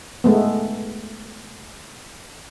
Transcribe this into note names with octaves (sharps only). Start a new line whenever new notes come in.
G#3 A3 B3